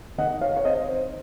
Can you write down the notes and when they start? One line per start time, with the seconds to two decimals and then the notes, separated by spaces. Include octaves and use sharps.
0.18 D#3 D#5 F#5
0.41 C#5 F5
0.57 C#5
0.64 C4 C5 D#5
0.88 C5